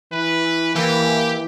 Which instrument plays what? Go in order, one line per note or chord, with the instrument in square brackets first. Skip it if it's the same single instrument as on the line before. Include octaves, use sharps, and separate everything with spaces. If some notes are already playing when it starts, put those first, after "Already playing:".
[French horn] E3 [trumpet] B4
[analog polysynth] E3 [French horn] A#3 [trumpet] G4